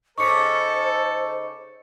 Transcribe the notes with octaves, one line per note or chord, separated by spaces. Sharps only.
C#3 D#4 A4 C5 C#6 D6 C#7